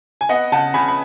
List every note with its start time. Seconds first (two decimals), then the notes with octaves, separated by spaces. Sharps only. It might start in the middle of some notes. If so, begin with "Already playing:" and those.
0.21 G#5
0.29 B3 D#5 F#5
0.52 C#3 F#5 A5
0.74 C#3 G#5 B5
0.88 B5